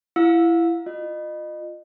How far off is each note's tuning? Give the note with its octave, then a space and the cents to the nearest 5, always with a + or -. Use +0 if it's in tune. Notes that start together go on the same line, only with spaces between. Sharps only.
E4 +20 F5 +40 E6 +0
F4 +0 D#5 -30